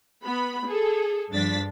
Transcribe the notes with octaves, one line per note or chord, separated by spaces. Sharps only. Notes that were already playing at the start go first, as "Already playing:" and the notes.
B3 B5
G#4 A4
G2 F3 D4 A6 B6